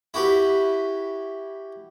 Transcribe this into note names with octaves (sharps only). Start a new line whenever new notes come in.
E4 F#4 G4 B4